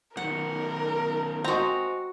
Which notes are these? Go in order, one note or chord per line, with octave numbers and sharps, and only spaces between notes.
F#2 D#3 A#4 F#5
G#3 C4 F#4 A#5